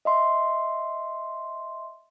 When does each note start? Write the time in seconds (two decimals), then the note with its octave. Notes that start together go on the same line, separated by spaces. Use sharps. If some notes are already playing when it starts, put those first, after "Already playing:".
0.05 D#5 E5 C6